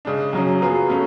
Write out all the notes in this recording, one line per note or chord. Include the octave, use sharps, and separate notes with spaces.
C#3 G#3 D4
F#2 C#3 F#3 C#4
F#3 B3 F4 G#4
F#3 A3 C#4